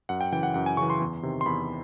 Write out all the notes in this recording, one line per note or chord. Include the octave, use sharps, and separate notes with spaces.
F#2 F#5
G5
C#3 E3 G5
F#5
F#2 F#5
G#5
C#3 E3 C#6
C6
E2
C3 D#3
C6
E2 B5